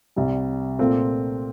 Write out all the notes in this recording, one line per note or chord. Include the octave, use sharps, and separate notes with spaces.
C2 C3 G3
A#2 A3 C4 F4